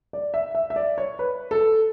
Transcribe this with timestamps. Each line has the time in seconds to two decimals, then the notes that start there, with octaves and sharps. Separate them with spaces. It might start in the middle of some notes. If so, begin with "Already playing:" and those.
0.13 D5
0.34 E5
0.55 E5
0.70 E5
0.76 D5
0.98 C#5
1.19 B4
1.51 A4